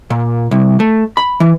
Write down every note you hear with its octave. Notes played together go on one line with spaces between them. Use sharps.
A#2
C2
A3
B5
E3